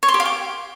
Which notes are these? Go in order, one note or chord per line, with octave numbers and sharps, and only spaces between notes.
C#5
C6
G4
F5
G5